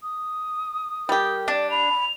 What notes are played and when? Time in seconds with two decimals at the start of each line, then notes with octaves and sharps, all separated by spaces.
0.03 D#6
1.09 G3 G4 A#4
1.48 D4 D5
1.71 B5 F7